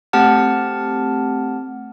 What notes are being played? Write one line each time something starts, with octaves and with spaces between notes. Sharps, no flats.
A3 C4 G4 F#5 A5 F6